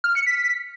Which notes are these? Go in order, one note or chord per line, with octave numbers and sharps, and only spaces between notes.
F6
C#7
B6